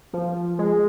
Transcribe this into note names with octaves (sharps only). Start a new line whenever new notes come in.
F3
G#3